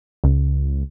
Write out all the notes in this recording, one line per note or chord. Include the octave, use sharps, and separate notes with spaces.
C#2